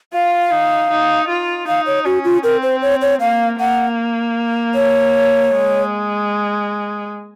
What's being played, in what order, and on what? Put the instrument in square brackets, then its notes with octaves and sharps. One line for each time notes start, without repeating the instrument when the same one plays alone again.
[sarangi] F4 [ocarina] F5
[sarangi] D#4
D#4
F4
[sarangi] D#4 [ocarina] F5
[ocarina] C#5
[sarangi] C#4 [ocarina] F#4
[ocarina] F4
[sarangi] C4 [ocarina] A#4
[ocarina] C5
C#5
C#5
[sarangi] A#3 [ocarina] F5
[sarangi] A#3 [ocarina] F#5
[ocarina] C#5
[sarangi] G#3